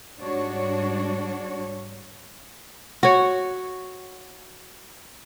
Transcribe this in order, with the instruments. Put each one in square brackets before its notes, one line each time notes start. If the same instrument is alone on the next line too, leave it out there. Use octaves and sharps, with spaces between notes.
[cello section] G#2 G3 D4 F#4 C#5
[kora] F#4 C#5